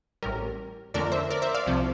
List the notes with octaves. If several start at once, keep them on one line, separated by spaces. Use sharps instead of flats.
A1 A2 G3 A#4
F2 D3 A3 A#4 D5
C5 E5
A#4 D5
C5 E5
D5 F5
C2 C3 F3